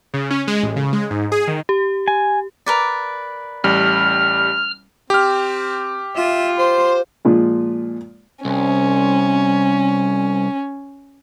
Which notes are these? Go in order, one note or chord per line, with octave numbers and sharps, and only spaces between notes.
C#3
C#4
G#3
A1
C#3
G#3
G#2
G#4
D#3
G4
G#5
A#4 B4 D5
A1 G3 F6
C4 G4 F6
F4 E5
C5 C6
A#2 F3 G#3
C2 C#4